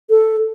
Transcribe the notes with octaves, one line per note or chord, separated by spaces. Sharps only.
A4